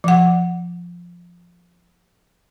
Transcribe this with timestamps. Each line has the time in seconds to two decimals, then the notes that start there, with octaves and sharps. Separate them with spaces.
0.04 F3 F#5